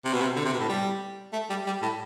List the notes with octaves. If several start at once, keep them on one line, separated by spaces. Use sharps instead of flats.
C3
B2
C3
D3
C3
B2
A2
G3
A3
G3
G3
A2